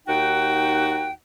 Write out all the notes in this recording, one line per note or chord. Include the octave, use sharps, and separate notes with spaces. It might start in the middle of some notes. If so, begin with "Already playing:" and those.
D#2 D#4 F#4 F#5 G5